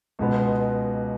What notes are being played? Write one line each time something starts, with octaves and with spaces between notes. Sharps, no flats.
C#2 B2 G#3 B3